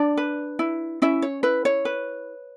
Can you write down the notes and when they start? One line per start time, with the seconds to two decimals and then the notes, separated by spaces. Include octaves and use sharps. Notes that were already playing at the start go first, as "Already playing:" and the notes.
Already playing: D4 D5
0.17 B4
0.59 E4
1.02 C#4 E4 E5
1.22 C#5
1.43 E4 B4
1.65 C#5
1.85 B4